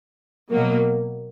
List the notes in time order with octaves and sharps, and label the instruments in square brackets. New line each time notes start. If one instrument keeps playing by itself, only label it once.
[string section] B2 F#3 A#3